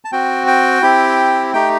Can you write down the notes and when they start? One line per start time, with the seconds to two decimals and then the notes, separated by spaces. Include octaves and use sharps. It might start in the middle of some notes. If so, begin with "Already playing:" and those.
0.05 A5
0.12 C4 F#4 G5
0.47 G5
0.82 C4 E4 G4
1.53 A3 D#4 G4 G5